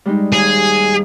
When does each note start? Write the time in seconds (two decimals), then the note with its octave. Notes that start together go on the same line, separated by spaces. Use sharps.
0.06 G3 G#3 D#4
0.33 D#2 G#4